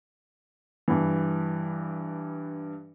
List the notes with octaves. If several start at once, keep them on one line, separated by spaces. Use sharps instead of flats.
G2 E3